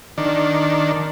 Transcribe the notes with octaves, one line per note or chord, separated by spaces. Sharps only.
D#3 D4